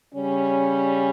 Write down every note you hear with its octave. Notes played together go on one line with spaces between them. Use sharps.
C#3 G3 C#4